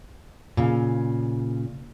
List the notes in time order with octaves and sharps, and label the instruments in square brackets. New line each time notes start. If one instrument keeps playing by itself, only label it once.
[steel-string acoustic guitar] A#2 C#3